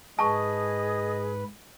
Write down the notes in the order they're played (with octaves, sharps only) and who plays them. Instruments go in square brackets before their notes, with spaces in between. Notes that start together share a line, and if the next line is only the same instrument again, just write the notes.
[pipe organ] G#2 B4 [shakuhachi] G#4 [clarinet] D#5 [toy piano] A5 C#6